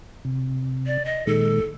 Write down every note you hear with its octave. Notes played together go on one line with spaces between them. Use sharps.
C3
D5
D#5
A#2 D#3 G#3 A4